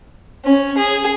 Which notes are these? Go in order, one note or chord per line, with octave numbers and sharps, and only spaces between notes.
C#4
G#4